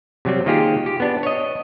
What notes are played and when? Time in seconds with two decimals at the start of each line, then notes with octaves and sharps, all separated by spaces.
0.25 C3 F#3 G3 C4
0.46 D#3 A#3 F4 G4 G#4
0.86 G4
1.00 B3 D4
1.23 C#5 D#5